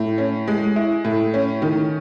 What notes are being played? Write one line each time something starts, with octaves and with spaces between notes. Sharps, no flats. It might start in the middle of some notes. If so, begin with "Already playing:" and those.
Already playing: A2
C#4
G#3
E4
A2
C#4
D#3